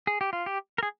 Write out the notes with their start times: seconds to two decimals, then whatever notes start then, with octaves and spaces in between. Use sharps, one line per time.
0.07 G#4
0.21 G4
0.33 F4
0.46 G4
0.78 A#4
0.83 G#4